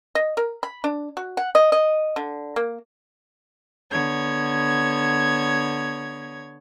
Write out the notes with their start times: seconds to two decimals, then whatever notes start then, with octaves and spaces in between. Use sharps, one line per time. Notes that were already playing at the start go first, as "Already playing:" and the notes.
0.15 D#5
0.37 A#4
0.63 B5
0.84 D4
1.17 F#4
1.37 F#5
1.55 D#5
1.72 D#5
2.16 D3
2.56 A#3
3.90 D3 B3 C#5 G#6